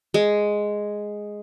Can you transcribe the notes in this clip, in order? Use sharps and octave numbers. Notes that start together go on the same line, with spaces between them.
G#3